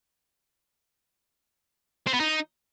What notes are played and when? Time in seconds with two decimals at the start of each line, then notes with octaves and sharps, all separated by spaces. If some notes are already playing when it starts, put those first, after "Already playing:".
2.07 C4
2.14 B3
2.20 D#4